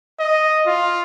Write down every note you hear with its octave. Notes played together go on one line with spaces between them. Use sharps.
D#5
F4